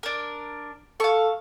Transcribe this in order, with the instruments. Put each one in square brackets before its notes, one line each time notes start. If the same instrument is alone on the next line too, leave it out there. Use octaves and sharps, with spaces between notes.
[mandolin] D4 A#4
[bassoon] A4 [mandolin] F5 C#6